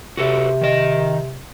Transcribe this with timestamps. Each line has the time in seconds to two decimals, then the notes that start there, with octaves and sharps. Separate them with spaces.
0.17 C3 F#4 A4 B4
0.61 D#3 D#5